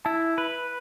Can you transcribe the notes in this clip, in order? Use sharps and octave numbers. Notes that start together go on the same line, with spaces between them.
E4 A5
B4 B5